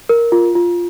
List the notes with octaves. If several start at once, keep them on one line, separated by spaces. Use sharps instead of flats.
A#4
F4
F4